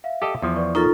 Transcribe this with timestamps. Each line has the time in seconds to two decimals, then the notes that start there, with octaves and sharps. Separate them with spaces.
0.04 E5 F5
0.22 G4 A4 D#5
0.42 E2 F3
0.55 B4 D5 C#6
0.75 D#4 F4 A4 A#4 A#5 C#6